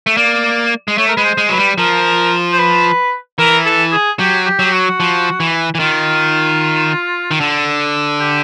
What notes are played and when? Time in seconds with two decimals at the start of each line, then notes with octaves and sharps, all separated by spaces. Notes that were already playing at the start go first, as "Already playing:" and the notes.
0.07 A3
0.17 A#3 D5
0.88 G#3
0.98 A3 C#5
1.08 A#4
1.16 G#3 B4
1.24 C5
1.38 G#3
1.49 F#3 B4
1.58 G3
1.78 F3 A#4
2.53 C5
2.58 B4
3.38 E3 A#4
3.65 A4
3.92 G#4
4.19 F#3 G4
4.46 G4
4.59 F#3
4.65 G4
4.72 F#4
5.00 F3
5.40 E3
5.75 E3
5.80 D#3 F4
7.31 D#3
7.40 D3
8.20 G4